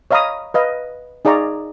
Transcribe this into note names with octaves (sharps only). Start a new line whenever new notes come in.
C#5 D#5 F5 A#5 B5 D#6
B4 D#5 F5
D#4 G#4 D5 F5 A#5 C#6